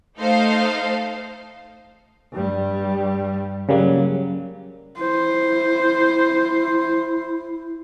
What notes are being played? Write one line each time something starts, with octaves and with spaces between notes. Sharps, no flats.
A3 D#4 A4 C5 F5
G2 G3
C#3 F#3 G3 A#3
E4 C5